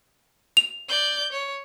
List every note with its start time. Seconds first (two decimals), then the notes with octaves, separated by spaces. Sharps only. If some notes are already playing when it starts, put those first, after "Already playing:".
0.57 F7
0.88 D5 G6
1.32 C#5